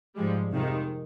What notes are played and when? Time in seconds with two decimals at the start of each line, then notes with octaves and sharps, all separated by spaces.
0.15 G#2 F3 G3 G#3
0.52 F2 C3 D#3 F3 G#3